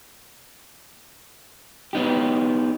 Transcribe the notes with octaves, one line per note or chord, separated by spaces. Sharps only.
B3 D#4 G4